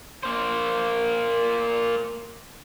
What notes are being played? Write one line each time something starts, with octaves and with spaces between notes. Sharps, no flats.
A#3 C5